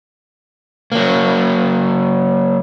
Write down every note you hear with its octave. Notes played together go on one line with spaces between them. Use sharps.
F#3 A#3